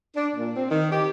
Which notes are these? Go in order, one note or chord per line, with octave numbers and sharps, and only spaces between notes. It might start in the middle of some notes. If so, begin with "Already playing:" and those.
D4
A#2
C4
D#3
G4